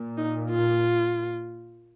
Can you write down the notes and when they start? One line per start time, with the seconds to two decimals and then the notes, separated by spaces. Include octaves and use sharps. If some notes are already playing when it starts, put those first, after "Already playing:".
Already playing: A#2
0.18 D#4
0.50 F4